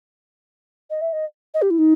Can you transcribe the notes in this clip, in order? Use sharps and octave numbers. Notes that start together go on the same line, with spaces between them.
D#5
E5
D#5
D#5
G4
E4
D#4